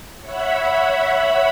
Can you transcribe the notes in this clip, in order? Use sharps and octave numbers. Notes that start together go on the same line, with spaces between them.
C#5 E5 F#5 B5